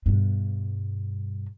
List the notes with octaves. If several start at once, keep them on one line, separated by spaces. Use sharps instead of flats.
G2 B2